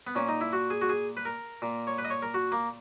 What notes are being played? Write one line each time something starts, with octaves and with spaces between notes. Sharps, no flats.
B3
A#2 C#4
D#4
E4
F#4
G#4
F#4
G#4
B4
A#4
A#2
C#5
B4
D#5
C#5
A#4
F#4
A#3